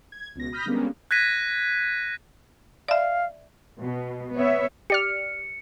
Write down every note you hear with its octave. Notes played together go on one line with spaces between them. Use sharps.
G#6
C#2 B2 A#6
B5 D#6 F6 G6 A#6 B6
D3 G3 G#3 A#3 B3 C#4
F#6 G#6 A#6 B6 D#7
D5 E5 F5
B2
B3 C#5 E5
G4 D5 F6 C#7